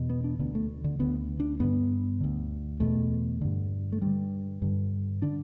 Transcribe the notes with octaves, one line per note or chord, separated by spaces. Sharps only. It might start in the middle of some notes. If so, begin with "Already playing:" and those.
Already playing: E2 B2
B3
D4
D2 D3 B3
A3
D3
D2 D3 B3
D4
G2 D3 B3
D2 D3
E2 B2 A3
G2 D3
A3
G2 D3 G3
G2 D3
D3 D4